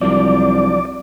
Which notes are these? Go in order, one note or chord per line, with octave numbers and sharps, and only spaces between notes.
C2 F3 F#3 D4 D5